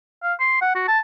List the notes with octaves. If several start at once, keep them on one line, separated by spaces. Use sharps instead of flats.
F5
C6
F#5
F#4
A5